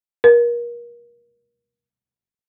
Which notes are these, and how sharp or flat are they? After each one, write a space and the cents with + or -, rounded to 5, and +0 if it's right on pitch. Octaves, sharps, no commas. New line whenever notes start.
A#4 +35